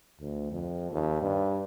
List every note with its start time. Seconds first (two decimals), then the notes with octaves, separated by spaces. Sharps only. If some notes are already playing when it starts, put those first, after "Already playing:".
0.20 D2
0.52 F2
0.92 D#2
1.22 G2